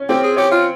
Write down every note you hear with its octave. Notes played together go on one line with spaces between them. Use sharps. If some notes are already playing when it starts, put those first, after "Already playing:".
Already playing: C#4
C4 G4
G#4
G4 C#5
F4